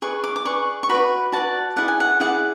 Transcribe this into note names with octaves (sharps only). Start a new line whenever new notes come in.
G#4 B4 D5 C#6
D6
D6
G#4 B4 D5 C#6
C#6
F#4 B4 D5 B5
F#4 B4 D5 A5
E4 G#4 D5 F#5
G#5
F#5
E4 G#4 D5 F#5